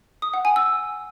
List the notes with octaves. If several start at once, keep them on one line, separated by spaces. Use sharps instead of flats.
D#6
F#5
G#5
E6